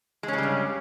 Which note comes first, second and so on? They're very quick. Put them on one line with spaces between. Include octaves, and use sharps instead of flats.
G#3 C#4 C#3 G3 G2